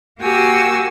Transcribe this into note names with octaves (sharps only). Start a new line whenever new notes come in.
A#3 F#4 G4 G#5 E6